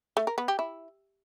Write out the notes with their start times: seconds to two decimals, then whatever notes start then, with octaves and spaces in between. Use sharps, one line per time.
0.17 A3
0.27 A#4
0.38 B3
0.48 G4
0.59 E4